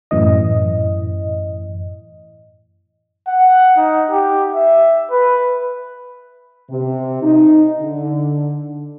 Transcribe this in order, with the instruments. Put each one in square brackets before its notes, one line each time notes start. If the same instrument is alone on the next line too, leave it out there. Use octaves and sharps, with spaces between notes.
[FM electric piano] F#2 A2 E3 D#5
[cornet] F#5
D#4
G4
E5
B4
[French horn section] C3
D#4
D3